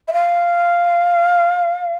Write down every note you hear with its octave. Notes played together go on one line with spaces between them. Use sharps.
E5
F5